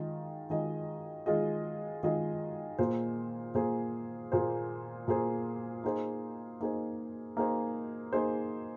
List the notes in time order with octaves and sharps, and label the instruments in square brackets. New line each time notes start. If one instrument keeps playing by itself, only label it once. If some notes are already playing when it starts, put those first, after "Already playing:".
Already playing: [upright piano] D#3 G#3 F4 G#4 D#5
D#3 G#3 F4 G#4 D#5
D#3 G#3 F4 G#4 D#5
D#3 G#3 F4 G#4 D#5
A#2 A#3 G#4 C5
A#2 A#3 G#4 C5
A#2 A#3 G#4 C5
A#2 A#3 G#4 C5
A#3 D#4 G#4 C5
A#3 D#4 G#4 C5
A#3 D#4 G#4 C5
A#3 D#4 G#4 C5